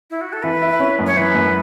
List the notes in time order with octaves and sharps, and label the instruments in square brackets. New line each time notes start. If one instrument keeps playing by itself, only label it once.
[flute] E4
F#4
A4
[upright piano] E3 [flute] B4
[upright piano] E4
C#4
F#2
[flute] C#5
[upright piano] E3 [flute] B4
[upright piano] F#2